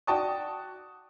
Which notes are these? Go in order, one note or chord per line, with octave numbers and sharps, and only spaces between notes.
F#4 D5 G5 A5 C#6 D#6